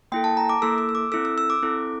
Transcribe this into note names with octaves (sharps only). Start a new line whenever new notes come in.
A#3 E4 A4 G5
A5
A#5
D6
A#3 E4 A4 E6
E6
E6
D6
C4 E4 A4 E6
E6
E6
D6
C4 E4 A4